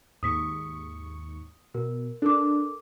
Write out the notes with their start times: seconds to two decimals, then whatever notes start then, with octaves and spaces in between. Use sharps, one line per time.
0.23 D#2 G#2 C#6 D#6 B6
1.74 B2 A#4
2.22 D4 A4 A#4 D6